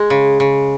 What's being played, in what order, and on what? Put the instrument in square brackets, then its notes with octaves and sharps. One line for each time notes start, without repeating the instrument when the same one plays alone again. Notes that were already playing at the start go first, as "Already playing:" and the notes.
Already playing: [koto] G#3
C#3
C#3